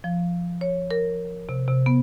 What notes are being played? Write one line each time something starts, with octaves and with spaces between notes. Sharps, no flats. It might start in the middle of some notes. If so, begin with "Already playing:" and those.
F3
C#5
A#4
C3
C3
B3